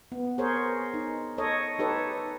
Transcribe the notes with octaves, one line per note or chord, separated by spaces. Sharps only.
B3
G#4 A#4 C5 C#5
D#4
A4 C#5 D#5
D#4 G4 A4 B4 C#5